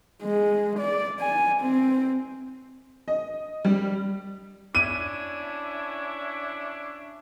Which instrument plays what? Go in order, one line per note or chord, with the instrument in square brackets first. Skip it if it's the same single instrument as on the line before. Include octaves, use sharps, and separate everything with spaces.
[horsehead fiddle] G#3
D5
G#5
C4
[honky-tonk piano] D#5
G3
[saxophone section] C#4 D4 E4 [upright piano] D#7